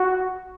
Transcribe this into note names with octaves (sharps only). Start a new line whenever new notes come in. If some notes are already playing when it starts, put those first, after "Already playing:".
Already playing: F#4